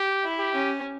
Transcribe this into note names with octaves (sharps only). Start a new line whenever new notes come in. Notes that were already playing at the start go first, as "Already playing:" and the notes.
Already playing: G4
E4
G4
C#4